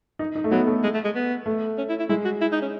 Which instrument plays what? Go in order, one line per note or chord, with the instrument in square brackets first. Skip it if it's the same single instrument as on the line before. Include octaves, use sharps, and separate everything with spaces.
[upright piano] D#4
D#4
A3
[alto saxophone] F#3 [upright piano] B3
[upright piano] A3
[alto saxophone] G#3
A3
G#3
B3
[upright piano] A3
[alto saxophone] C#4
E4
E4
[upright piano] G#3 [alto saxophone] E4
[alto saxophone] F#4
E4
D#4
C#4